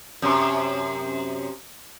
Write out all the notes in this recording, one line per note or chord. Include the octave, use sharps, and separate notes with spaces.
F#2 C3